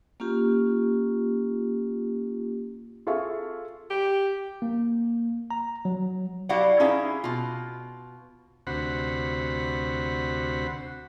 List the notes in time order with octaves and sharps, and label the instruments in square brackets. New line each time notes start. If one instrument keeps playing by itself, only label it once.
[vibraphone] A#3 C#4 F4 G4
[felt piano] F4 G#4 A4 E5 F5 C#6
[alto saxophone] G4
[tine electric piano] A#3
A#5
F#3
[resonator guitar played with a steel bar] E4 F#4 G4 D5 F5 F#5
C#4 D#4 E4 G#4 E5 F5
B2 F4
[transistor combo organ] D2 C3 F#4 C5 F#5 B5